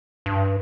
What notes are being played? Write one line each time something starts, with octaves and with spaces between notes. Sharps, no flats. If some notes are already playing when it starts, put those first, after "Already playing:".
G2